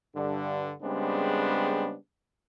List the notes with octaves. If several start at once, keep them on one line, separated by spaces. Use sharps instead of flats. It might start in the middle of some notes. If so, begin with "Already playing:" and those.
G2 D3
C#3 G3 G#3 B3 C4 D4